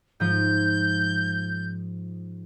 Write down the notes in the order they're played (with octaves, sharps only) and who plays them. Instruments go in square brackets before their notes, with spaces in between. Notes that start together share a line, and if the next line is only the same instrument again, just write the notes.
[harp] G#2 F3 [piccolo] G6